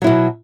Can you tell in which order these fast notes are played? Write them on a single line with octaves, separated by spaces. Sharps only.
F#3 E4 B2